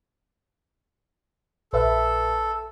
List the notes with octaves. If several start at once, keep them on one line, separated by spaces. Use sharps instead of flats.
A#1 A4 B4 E5